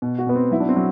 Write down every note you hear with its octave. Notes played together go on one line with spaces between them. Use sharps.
B2
F#4
B2 B3
C4
F#3 E4
D4
C4
F#3